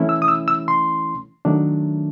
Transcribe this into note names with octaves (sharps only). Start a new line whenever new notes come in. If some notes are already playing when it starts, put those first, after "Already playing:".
Already playing: E3 A3 C#4 E4
E6
D#6
E6
E6
C6
D#3 F#3 A3 D4